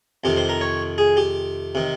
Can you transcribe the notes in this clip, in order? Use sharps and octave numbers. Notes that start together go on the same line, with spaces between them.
F2 C3 D#3 G4
C5
A#4
C#5
G#4
G4
C3 D#3